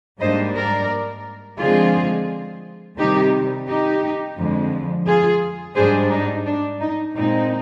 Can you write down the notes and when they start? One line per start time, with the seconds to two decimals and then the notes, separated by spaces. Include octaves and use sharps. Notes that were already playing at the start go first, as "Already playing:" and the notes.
0.20 G#2 G3 A#3 D4 C5 D#5
0.55 A#4 D5
1.59 D3 F3 G#3 C4 F4 G#4
2.98 C3 D#3 G3 D#4 G4
3.68 D#4 G4
4.37 F2 D3 F3 G#3
5.06 F4 G#4
5.76 G#2 G3 D4 G#4 C5
6.12 D#4
6.46 D4
6.81 D#4
7.15 A#2 G#3 C4 D#4